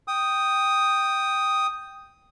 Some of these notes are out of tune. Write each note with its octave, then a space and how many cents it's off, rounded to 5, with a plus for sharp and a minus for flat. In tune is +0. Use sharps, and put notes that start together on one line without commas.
G5 +0 D#6 +0